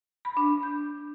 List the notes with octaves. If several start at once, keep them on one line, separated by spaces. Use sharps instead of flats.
B5
D4
G6